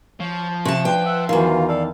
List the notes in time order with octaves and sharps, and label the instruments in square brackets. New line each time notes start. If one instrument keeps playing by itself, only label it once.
[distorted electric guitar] F3 [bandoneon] C#5
[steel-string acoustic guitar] C3 A5 [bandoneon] C#6
[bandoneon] D4 [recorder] B4 [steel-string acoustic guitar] G5
[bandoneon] E5 F#5
[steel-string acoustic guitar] E2 D#3 [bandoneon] E3 F#3 F4 [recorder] F5
[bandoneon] A4 F5 [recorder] D5